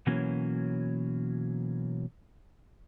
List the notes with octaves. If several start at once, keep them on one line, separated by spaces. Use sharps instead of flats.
B2 E3 F#3 A#3 C#4